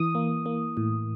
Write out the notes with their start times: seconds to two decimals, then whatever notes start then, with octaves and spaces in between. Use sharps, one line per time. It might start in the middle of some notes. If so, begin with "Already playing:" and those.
Already playing: E3 D#6
0.15 A#3
0.46 A#3
0.77 A2